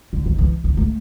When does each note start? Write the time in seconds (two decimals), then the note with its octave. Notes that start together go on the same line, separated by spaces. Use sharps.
0.13 D3
0.26 D#3
0.39 E3
0.64 E3
0.77 A3